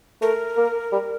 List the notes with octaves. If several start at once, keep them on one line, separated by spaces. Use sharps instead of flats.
A3 A#4
A#3
G3